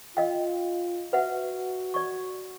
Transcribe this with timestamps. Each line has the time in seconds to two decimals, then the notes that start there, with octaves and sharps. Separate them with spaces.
0.17 F4 D#5 F5 G5
1.13 F#4 B4 E5 F#5
1.94 D5 C#6